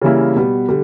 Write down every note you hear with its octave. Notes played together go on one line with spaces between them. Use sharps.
C#3 E3 G3 A#3 E4
B2 G3 B3
D3 G3